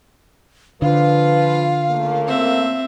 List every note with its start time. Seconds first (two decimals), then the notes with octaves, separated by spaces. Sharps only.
0.82 D3 F3 F4 B4 F5
1.89 C#3 A3 A#3
2.27 C4 E5